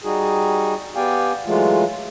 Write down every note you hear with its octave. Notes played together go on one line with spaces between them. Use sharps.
G3 D#4 F#4 G#4
B3 G4 D5 F5 G5 G#5
E3 F#3 G#3 A3 F4